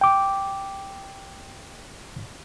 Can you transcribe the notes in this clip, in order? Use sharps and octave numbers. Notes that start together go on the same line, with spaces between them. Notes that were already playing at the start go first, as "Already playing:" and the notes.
G5 D6